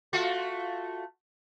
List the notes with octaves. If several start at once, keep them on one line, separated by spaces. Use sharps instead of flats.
A3 F4 F#4